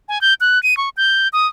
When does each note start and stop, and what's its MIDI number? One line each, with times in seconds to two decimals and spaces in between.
0.09 0.21 80
0.21 0.34 91
0.41 0.61 90
0.63 0.77 99
0.77 0.89 85
0.97 1.28 91
1.33 1.47 87